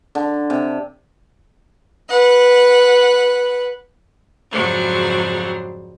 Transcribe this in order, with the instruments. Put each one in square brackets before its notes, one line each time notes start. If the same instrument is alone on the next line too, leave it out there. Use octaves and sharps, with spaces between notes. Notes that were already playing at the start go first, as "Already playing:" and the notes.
[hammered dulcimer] D3
C3
[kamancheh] B4 F#5
[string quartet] F2 G#2 C#3 F#3 G3 C5